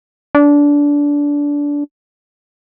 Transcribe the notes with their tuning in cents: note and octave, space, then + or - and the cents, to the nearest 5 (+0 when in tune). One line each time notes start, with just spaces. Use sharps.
D4 -20